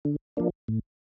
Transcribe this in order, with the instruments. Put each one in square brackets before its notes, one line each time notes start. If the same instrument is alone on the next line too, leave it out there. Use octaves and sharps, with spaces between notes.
[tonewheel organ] D3
F3 A#3 D4
A2